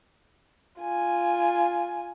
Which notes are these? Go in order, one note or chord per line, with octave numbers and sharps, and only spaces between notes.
F4 G#5